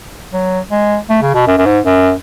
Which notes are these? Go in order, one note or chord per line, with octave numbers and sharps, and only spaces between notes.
F#3
G#3
A3
C#3
B2
F#2
F#2
G#2
F#2